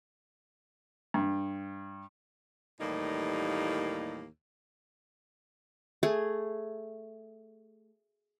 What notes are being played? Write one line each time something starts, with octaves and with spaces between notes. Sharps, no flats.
G2
D#2 A2 E3 G3 A#3 D#4
A3 G#4